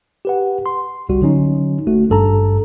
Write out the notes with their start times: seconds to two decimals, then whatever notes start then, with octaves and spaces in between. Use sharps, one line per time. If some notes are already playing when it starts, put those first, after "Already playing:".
0.25 G4 B4 F#5
0.66 C6
1.09 G1 C2 G3 F#4
1.22 D3 F#3 C#4 D#4
1.87 G1 A3 F#4
2.10 G#1 G2 A4 A5 A#5